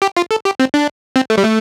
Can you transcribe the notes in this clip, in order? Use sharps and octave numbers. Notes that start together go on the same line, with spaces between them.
G4
F4
A4
G4
C4
D4
C4
A3
G3
A3